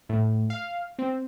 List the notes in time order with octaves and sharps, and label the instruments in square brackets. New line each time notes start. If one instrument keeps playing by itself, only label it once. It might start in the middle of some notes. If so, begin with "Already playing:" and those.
[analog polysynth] A2
F5
C4